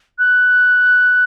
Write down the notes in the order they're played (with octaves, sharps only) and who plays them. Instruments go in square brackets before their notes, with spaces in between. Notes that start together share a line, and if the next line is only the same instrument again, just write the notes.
[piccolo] F#6